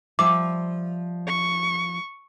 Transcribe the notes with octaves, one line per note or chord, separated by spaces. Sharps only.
F3 G3 E5 D6
C#6